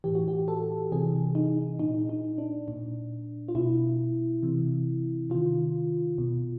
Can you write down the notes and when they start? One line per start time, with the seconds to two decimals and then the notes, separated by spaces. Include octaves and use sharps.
0.04 A2 E3 G4
0.15 F#4
0.28 G4
0.48 A4
0.92 C3 E3 G#4
1.35 D#4
1.79 A#2 D#4
2.09 D#4
2.38 D4
2.68 A#2
3.48 F4
3.55 B2 E4
4.43 C3 E3
5.30 C3 D#3 F4
6.18 B2